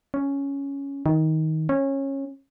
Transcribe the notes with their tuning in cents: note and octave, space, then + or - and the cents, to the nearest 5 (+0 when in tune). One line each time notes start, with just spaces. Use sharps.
C#4 +5
D#3 +20
C#4 -20